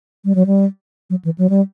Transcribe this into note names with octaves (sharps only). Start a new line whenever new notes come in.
G3
F#3
G3
F#3
E3
F#3
G3